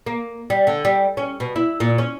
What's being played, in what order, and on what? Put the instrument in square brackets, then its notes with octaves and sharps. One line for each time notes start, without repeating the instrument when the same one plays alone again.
[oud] A#3
G3
D3
G3
C#4
B2
E4
A#2
C#4